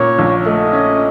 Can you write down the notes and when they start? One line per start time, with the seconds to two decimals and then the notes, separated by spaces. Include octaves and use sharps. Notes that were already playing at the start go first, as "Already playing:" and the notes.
Already playing: A#2 C#4 C#5
0.19 A#1
0.46 A3 D#5
0.73 C#4